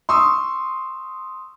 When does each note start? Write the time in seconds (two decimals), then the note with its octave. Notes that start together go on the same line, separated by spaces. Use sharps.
0.09 C6 C#6 D#6 E6